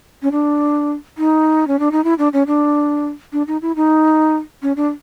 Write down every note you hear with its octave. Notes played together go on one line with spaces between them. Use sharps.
C#4
D4
D#4
C#4
D4
D#4
E4
D4
C#4
D4
D4
D#4
E4
D#4
C#4
D4